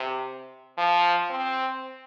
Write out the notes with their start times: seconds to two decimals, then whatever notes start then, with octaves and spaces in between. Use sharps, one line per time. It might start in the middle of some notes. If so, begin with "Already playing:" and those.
Already playing: C3
0.78 F3
1.30 C4